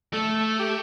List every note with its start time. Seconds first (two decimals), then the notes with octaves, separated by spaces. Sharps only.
0.13 A3 A4
0.59 G4